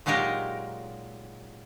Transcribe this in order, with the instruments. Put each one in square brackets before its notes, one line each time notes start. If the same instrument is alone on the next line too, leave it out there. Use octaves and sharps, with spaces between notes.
[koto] A#2 F#3 G#3 D#4 G4 A#4